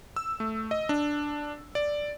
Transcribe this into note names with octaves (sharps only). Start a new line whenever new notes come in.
E6
A3
D#5
D4
D5